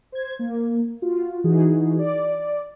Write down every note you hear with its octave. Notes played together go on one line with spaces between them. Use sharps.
C5 G#6
A#3
F4 F#4
E3 D#4 F#4 G#4
D5